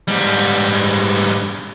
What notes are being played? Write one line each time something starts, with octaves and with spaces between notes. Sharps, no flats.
G#2 G3